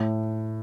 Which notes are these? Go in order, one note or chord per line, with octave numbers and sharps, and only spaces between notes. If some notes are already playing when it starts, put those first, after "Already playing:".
Already playing: A2